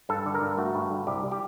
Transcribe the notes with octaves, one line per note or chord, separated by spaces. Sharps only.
G2 A4
D3
A#4
G2
A3 F#4
G2
D3
C2 G4
G3
G4